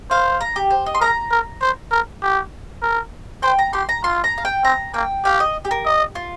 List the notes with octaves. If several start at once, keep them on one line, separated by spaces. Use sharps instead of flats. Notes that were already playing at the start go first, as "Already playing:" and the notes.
C5 F5
A#5
G4
C5
D#5
C6
A#4 A#5
A#4
C5
A#4
G4
A#4
C5 G5
A#5
G4 C6
A#5
F4 C6
A#5
F5
G5
C4 A#5
A#3 G5
G4 F5
D#5
G4
A#4
D#5
F4